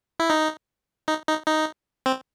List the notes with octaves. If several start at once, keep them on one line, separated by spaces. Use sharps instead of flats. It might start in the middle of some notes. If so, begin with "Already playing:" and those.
E4
D#4
D#4
D#4
D#4
C4